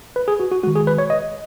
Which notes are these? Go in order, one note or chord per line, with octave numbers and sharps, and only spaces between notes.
B4
G#4
F#4
F#4
D#3 G#3 F#4
G#4
B4
C#5
D#5